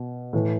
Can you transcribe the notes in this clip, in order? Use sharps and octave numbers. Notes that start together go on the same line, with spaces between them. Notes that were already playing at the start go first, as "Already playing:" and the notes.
Already playing: B2
A2 E3